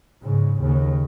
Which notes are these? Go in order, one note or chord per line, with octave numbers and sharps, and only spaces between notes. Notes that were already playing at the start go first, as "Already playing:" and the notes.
G#2 C#3
D#2 C#3